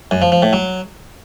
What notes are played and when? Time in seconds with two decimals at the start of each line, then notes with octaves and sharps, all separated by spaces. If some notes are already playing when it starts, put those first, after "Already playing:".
0.11 F#2
0.22 F3
0.32 F3
0.42 A2
0.53 F#3